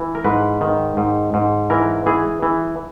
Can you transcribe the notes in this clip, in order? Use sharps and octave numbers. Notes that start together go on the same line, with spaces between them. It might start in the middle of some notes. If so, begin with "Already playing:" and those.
Already playing: E3
A#4
G#2 B4
D#3
G#2
G#2
E3 A#4
E3 G#4
E3